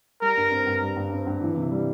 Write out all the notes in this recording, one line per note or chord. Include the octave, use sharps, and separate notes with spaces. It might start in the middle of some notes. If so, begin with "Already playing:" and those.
G3 A#4
G2
C4
G2
G3
G2
C4
G2
E3
C3
G3